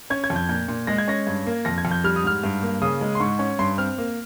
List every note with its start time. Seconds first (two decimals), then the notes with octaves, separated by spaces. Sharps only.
0.10 C#4 G#6
0.24 G#6
0.30 F2
0.36 G6
0.49 A#2 G6
0.68 A#2
0.87 G#3 A#6
0.98 G#6
1.08 C#4 A#6
1.27 G2
1.46 A#3
1.65 F2 A#6
1.78 G#6
1.85 F2
1.91 G6
2.04 G3 F6
2.16 D#6
2.24 G#2 F6
2.43 G2
2.63 A#3
2.82 C#3 D#6
3.01 G#3
3.15 C6
3.20 G#2 C#6
3.39 C#4
3.59 G2 C6
3.78 C4 F6
3.98 A#3